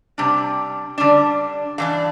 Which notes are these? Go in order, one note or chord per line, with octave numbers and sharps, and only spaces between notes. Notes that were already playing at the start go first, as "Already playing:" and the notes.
C3 G3 D4
D3 G3 D4
G2 E3 D4 F5